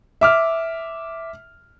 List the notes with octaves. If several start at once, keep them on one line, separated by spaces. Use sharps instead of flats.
E5 D6 F6